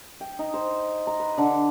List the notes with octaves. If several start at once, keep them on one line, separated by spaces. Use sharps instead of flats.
G5
D#4
C5
A#5
B4
D3